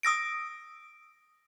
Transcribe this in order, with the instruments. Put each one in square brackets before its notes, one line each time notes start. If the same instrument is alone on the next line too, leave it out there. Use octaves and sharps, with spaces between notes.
[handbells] D#6 E6 A#6 D7